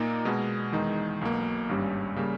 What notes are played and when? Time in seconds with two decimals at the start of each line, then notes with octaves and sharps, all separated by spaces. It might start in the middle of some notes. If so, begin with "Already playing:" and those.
Already playing: A#2 A#3 D#4
0.25 B2 G#3 B3
0.72 E2 D#3 G#3 D#4
1.21 B1 B2 A#3
1.69 G#1 G2 G3 C#4 G4
2.16 C#3 G3 A#3